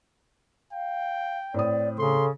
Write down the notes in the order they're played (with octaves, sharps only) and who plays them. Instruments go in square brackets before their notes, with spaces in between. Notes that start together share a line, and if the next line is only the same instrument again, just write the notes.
[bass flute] F5 [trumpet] G5
[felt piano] A2 C4 D#6 [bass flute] D5
[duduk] C#3 [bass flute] A4 [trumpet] C6